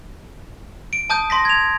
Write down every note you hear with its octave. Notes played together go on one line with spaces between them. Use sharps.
D7
A5 D#6 G6
C6 A#6 B6
G#6 F7